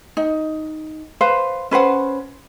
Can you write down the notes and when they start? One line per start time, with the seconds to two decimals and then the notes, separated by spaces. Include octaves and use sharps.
0.17 D#4
1.21 B4 C5 F5
1.71 C#4 B4 C5 F#5